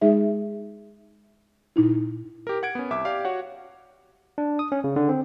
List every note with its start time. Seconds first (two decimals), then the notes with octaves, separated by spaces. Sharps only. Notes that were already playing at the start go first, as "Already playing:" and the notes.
0.01 G#3 D#4 G#4 E5
1.76 A#2 D#4 E4
2.47 G4 A#4
2.63 F#5 G#6 D7
2.75 B3 C#4
2.90 C2 E5 D6
3.05 G4 D5 F5
3.25 F#4 C#5 F#5
4.38 D4
4.59 D#6
4.72 C#4
4.84 C#3
4.96 D3
5.09 C4